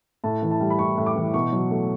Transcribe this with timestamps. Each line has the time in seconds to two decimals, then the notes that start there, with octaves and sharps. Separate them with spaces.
0.24 A2 A5
0.42 E3
0.51 A5
0.60 G3
0.70 B5
0.79 A2 C#6
0.97 A2
1.06 D6
1.16 E3
1.34 B2 C#6
1.53 F#3
1.71 A3